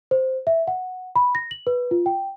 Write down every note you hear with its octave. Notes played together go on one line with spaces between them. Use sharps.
C5
E5
F#5
B5
A#6
F#7
B4
F4
G5